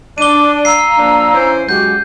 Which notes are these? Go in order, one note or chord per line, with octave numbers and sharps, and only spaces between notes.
D4 D6 D#7 G7
F5 A#5 E6 C7
F3 A#3 D4
E3 C#4 C5
F#2 G#3 F#4 G4 G6